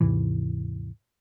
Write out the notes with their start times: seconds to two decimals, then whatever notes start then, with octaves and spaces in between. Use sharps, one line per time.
0.01 D#2 G#2 C3 E3